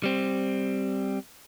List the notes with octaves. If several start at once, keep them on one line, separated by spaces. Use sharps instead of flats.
G3 C4